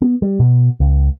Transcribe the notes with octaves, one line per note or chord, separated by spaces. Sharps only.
B3
G3
B2
C#2